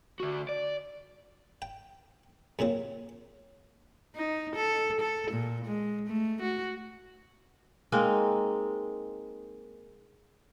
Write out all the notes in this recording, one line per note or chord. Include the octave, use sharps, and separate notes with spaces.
D3 F#4
D5
G5
F#2 A#2 C#3 C4
D#4
A4
A4
A#2
G#3
A3
F#4
G#3 A#3 C4 D#4